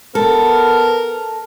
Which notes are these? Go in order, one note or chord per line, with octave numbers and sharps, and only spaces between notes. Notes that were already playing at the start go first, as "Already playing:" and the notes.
B3 A4 A#4